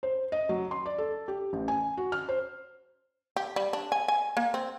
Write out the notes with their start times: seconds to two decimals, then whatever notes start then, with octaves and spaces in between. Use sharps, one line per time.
0.03 C5
0.32 D#5
0.49 F#3
0.71 C6
0.86 D5
0.98 A4
1.28 G4
1.53 A1
1.68 G#5
1.97 F#4
2.12 F6
2.29 C5
3.36 G4
3.56 G3
3.73 D4
3.92 G#5
4.08 G#5
4.37 A#3
4.54 C4